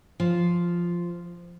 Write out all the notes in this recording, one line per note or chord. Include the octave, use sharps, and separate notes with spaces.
F3